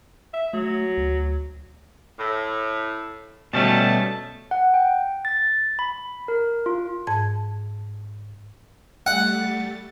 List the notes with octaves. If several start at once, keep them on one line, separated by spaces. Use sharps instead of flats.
E5
F#3 A3
D2
A2
B2 G3 A3 C#4 A5
F#5
G5
A6
B5
A#4
F4
G#2 A5 G#6
G3 A3 F#5 A6